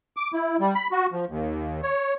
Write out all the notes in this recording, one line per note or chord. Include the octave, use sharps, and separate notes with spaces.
D6
E4
G3
B5
F#4
F3
D#2
C#5